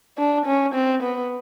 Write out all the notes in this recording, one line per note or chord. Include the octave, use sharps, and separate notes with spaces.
D4
C#4
C4
B3